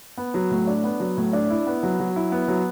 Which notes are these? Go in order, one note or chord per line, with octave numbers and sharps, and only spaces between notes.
B3
F#3
A2
D4
B3
F#3
A2
D4
E4
B3
F#3
F#3
E4
B3
F#3